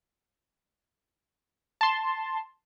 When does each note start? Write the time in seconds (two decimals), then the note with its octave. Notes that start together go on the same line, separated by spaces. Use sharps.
1.81 A5 C6